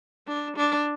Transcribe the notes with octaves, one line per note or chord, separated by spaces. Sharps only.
D4
D4